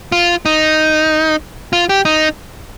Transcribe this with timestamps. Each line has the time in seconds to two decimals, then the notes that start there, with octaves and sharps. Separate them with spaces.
0.12 F4
0.46 D#4
1.73 F4
1.89 G4
2.05 D#4